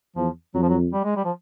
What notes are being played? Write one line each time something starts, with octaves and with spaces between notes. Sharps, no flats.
E2 F3
F2 F#3
F3
F#3
G3
G#3
G3
F3